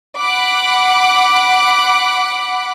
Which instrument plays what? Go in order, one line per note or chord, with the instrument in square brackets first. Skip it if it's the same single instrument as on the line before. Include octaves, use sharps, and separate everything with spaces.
[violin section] F#5 B5 D6 F#6